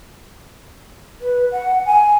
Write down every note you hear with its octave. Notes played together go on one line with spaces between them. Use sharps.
B4
F#5
G#5